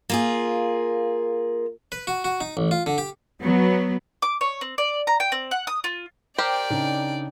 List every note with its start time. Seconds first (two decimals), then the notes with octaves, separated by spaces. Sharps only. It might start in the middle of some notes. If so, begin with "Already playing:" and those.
0.10 A#3 F4 G#4
1.92 B4
2.07 F#4
2.24 F#4
2.41 D#4
2.57 A1
2.71 F4
2.86 D3
2.98 G4
3.42 F#3 B3
4.22 D6
4.41 C#5
4.61 C4
4.78 D5
5.07 A#5
5.20 G5
5.32 C4
5.51 F#5
5.67 D#6
5.84 F4
6.38 G4 A#4 C5 D5 G5
6.70 C#3 D4 D#4